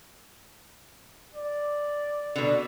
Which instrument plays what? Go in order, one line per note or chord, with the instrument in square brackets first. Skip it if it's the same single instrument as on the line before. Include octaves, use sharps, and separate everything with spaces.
[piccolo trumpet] D5
[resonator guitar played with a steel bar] B2 D3